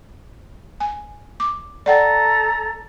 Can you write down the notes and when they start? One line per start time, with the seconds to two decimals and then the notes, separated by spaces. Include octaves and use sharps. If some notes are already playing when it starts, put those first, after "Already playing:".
0.80 G#5
1.40 D6
1.86 A4 D5 F#5 G5 A#5